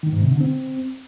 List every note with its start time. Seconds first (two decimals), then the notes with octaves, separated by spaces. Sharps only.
0.03 D#3
0.12 G#2
0.22 C3
0.31 D3
0.41 C4